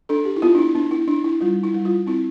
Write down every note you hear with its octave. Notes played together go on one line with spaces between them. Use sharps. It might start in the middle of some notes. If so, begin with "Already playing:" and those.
D4 A4
G4
E4
B3 F4
D4
E4
B3 D4
E4
D4
E4
G3 F4
E4
G3
F4
C4 E4